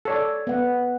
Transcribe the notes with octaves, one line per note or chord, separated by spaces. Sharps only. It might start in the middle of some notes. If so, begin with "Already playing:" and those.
A4 C#5 D5
B3 F#5